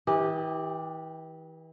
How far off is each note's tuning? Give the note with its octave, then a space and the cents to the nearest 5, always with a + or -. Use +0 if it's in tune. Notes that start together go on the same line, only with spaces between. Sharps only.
E3 -35 G4 +0 D#5 +0